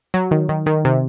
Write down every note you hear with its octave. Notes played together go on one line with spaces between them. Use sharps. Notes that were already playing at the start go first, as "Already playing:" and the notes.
F#3
D#3
D#3
D#3
C3